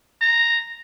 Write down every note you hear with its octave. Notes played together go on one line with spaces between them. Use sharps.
A#5